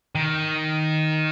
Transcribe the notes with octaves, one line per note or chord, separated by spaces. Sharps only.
D#3